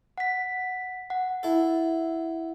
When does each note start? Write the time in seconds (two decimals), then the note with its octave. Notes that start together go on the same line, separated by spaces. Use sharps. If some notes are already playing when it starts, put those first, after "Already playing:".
0.18 F#5 B6
1.10 F#5
1.43 E4 A4